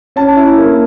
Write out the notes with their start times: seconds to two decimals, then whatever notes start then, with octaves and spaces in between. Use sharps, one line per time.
0.16 C#4 A5
0.37 E4
0.58 A#3